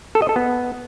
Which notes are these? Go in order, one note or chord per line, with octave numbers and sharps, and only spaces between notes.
A4
D#5
A4
B3